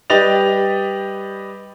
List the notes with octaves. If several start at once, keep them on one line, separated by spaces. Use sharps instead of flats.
G3 G4 B4 D#5 A6 F7